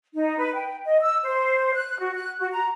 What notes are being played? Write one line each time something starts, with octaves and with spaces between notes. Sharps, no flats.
D#4
B4
G5
D#5
E6
C5
F#6
F#4
F#6
F#4
A#5